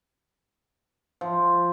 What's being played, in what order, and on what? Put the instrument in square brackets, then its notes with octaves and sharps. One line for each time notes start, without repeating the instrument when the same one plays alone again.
[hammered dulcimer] F3